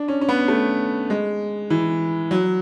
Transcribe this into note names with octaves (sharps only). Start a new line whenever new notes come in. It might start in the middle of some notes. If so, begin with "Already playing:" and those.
Already playing: D4
C#4
C#4
B3
A3
G#3
E3
F#3